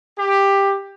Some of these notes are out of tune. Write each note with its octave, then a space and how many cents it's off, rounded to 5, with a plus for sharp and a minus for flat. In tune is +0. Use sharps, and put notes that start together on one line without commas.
G4 +10